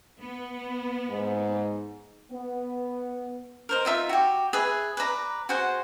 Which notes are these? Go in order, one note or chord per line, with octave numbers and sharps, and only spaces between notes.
B3
G#2
B3
A#4 C5 D#5
D#4 F4 E5
F#4 G4
G#4 B4 E5
B4 D5 A#5
F#4 G#4 C5 F#5